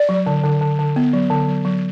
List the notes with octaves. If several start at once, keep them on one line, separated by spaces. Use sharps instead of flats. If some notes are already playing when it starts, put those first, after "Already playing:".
Already playing: D5
F#3
D3
D3
D3
D3
B3
F#3
D3
F#3
F#3